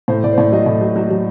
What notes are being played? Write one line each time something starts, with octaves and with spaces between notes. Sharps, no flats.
A2 C5
A2 D5
C5
A2 D5
F#3 D#5
A2
F#3
F#3
F#3